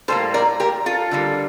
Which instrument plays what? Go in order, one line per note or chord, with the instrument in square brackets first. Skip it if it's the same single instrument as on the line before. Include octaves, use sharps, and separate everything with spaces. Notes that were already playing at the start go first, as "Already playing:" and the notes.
[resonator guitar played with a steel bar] A2 G3 A#3 A4 C5
A#4 D5
G4 A#4
F4 A4
D3 G3 A#3